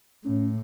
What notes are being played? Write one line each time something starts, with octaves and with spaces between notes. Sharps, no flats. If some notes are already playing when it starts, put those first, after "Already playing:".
A2 C#4